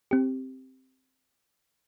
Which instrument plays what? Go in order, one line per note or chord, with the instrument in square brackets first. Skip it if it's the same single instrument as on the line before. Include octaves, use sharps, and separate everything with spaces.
[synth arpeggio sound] C4 G4